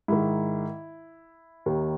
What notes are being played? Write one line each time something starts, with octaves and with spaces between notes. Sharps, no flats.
G#2 D#3 E4
D#2 D#3